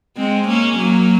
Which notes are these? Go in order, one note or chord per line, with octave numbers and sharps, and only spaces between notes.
G#3 C4
A#3 C#4
F#3 A#3